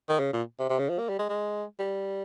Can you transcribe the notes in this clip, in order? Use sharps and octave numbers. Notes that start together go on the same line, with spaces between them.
D#3
C#3
A#2
C3
C3
C#3
F3
A#3
G3
G#3
G#3
G3